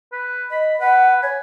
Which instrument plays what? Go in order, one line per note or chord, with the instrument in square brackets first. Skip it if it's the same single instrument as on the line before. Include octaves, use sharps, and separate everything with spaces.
[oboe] B4
[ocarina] D#5 [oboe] B5
[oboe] B4 [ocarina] F#5
[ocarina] C#5 [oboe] G#5